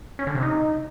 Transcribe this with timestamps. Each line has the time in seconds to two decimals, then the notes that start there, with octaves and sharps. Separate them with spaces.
0.19 C#4
0.27 D3
0.35 C3
0.43 D#4